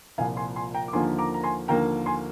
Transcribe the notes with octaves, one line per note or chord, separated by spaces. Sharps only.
C2 A#2 F3 F5 G#5
G#5 C6
G#5 C6
G5 A#5
D6
D#2 D3 F3 A#3 G#5 C6
A#5 D6
A#5
G#5 C6
D#2 D3 F3 A#3 G5 A#5
G#5 C6